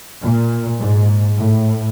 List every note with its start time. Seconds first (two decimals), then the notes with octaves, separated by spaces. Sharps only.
0.21 A#2
0.79 G#2
1.38 A2